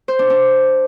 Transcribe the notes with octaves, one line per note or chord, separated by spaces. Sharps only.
C5
D4
D4